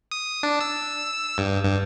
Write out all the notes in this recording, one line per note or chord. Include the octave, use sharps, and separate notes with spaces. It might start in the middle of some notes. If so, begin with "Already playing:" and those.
D#6
D4
E6
G2
G2